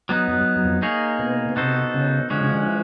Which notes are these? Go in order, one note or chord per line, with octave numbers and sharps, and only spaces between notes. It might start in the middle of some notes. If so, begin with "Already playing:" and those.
F#3 B3 D#4
F#2
F#2
F2
A#3 D#4 G#4 C#5
B2
B2
C3 B3 D#4 F#4 A4 C5
C#3
D3 F3 G#3 C#4 F#4
C#3
D3
E3